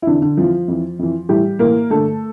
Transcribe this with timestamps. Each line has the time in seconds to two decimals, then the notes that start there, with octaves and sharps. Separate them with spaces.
0.02 E4
0.07 F2 D3 E3 D4
0.22 D3 D4
0.37 F2 E3 F3 F4
0.68 F2 E3
0.99 F2 E3
1.29 A2 E3 G3 G4
1.59 A2 E3 A#3 A#4
1.90 G2 D3 A3 A4